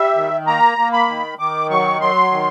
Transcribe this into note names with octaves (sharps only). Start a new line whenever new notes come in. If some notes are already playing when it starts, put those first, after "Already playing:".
Already playing: G3 E5
D#3
A#3 A#5
A#3
B5
D#3
D#3 D6
F#3 C#6
F#3 C6
D#3